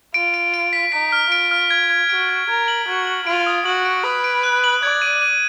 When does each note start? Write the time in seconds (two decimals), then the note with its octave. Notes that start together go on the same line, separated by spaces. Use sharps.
0.14 F4 D7
0.34 D7
0.54 D7
0.73 B6
0.92 D#4 B6
1.12 F6
1.31 F4 D7
1.51 F6
1.70 G#6
1.90 G#6
2.09 F#4 D7
2.29 G#6
2.49 A#4 G#6
2.68 F#7
2.88 F#4 G#6
3.07 F#7
3.27 F4 D7
3.46 D#6
3.65 F#4 F#7
3.85 D7
4.04 B4 D#6
4.24 D7
4.43 F#6
4.64 F#7
4.83 D5 G#6
5.02 D#7
5.22 D#7